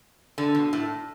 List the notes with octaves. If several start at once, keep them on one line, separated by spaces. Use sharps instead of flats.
D3
B2
A2